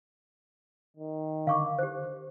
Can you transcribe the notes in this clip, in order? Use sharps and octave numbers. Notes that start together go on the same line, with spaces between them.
D#3
D3 F5 C#6 D6
G4 C5